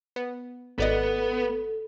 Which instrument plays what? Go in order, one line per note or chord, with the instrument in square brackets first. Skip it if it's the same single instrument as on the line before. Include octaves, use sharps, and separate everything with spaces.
[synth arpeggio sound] B3
[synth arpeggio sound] G#1 D5 D#5 [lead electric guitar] B3 [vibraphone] A4